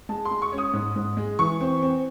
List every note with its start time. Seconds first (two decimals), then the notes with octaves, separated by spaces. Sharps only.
0.09 G#3 A5
0.25 C6
0.31 G#3
0.42 C#6
0.52 C#4
0.58 D#6
0.73 G#2
0.96 G#2
1.17 G#3
1.39 E3 C#6
1.61 C4
1.82 C4